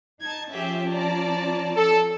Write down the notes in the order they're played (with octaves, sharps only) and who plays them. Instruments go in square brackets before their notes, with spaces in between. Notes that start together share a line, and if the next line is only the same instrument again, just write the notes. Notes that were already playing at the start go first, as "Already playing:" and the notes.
[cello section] D#4 [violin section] A5 G#6
[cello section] F3 C#4 F4 [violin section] G4 G#4 E5
[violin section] D5 A5 A#5
[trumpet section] A4